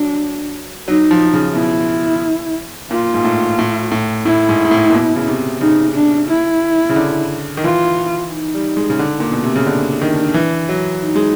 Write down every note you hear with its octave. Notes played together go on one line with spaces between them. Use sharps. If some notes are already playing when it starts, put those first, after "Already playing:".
Already playing: F#3 D4
F#3 D#4
F3
C#3
B2 E4
A#2 F4
G#2
A2
A2
A2
A2 E4
G#2
G#2
A2
A#2
B2
C#3
C3
C#3 D#4
D4
E4
C#3
D3
D#3
E3 F4
D#4
G3
G#3
C#3
D3
A#2
B2
C3
C#3
D3 D4
D#3
E3
F#3
D#4
G#3